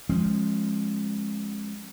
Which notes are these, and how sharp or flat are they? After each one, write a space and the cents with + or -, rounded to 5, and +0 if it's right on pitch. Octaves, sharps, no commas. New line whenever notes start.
F3 +0 G#3 +0 C#4 -40